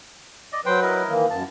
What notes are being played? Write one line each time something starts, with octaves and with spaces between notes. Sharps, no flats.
D5 D#5
F#3 B4 C5 G5
E4 A#4 D#5
D#3 E3 A#3
F#2 A5